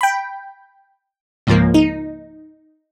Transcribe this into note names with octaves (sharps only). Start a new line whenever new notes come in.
G5 B5
C#2 G#2 F3 A#3
D#4